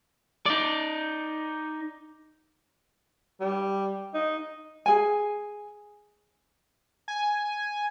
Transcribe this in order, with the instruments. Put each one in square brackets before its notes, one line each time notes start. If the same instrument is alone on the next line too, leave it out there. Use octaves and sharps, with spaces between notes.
[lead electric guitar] D#4 D5
[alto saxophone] G3
D#4
[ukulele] G#4 G#5
[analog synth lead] G#5